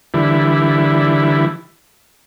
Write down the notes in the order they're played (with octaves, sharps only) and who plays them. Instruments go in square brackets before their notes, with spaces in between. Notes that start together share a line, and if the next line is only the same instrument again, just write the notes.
[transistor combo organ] D3 E3 G3 E4